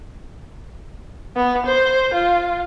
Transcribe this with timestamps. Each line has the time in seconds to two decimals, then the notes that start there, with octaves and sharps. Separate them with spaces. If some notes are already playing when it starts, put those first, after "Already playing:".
1.36 B3
1.66 C5
2.14 F4